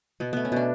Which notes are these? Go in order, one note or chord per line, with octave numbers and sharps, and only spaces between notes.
B2 B3
A3 B3
C#4
B2 D4